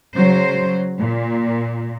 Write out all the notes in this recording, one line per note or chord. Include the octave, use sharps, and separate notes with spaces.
C#3 F#3 C5
A#2